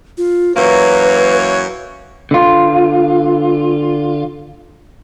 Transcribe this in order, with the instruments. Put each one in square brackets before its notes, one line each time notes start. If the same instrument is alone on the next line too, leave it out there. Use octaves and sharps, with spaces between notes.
[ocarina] F4
[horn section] F#2 E3 A#3 [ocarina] B4 [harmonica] C#5
[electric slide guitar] D3 F4